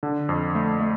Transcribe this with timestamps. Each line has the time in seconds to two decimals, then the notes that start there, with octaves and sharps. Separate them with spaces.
0.03 D3
0.29 F2
0.55 A3
0.81 A3